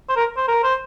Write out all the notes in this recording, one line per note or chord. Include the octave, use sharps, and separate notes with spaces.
C5
A#4
C5
A#4
C5